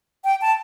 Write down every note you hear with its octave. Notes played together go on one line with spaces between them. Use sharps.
G5
A5